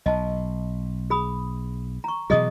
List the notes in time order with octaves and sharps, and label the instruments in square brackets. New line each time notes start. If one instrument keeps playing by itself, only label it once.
[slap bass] B1 [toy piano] D#5 A5
[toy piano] G#4 B5 D#6
A#5 C#6
[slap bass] B2 E3 F#3 [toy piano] G#4 D#5 D#6